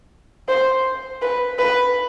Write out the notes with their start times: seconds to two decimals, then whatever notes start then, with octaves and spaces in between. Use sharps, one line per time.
0.48 C5
1.22 B4
1.58 B4